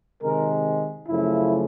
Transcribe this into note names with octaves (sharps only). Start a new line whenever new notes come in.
C3 D#3 G#3 A#4
F#2 C#3 F3 A3 E4